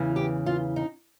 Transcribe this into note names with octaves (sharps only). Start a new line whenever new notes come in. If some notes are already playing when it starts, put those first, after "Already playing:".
Already playing: E2 C#3 E3
G4
F4
D#4